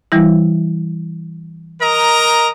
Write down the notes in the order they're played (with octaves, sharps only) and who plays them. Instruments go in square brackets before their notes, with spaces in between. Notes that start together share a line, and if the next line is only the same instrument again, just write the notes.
[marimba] E3 G3 E4
[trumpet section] A#4 D#5 A#5